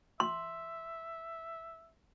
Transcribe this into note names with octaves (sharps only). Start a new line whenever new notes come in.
E5 C6